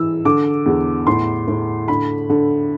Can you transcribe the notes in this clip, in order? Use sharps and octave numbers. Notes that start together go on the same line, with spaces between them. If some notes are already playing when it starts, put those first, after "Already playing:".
Already playing: E3 E6
D3 D6
E2
A2 C6
A2
D3 B5
D3